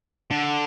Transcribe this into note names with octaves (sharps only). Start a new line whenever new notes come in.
D3